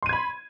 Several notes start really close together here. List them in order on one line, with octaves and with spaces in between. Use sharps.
C6 D#7 G#6 B5